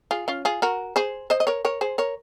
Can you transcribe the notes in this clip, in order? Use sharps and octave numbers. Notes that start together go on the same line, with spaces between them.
F4 G#4
C#4 F4
F4 G#4
F#4 A#4
G#4 C5
C5 D#5
D#5
A#4 C#5
A#4 C#5
G#4 C5
A#4 C#5